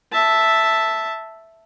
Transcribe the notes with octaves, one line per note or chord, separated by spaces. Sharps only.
E5 A5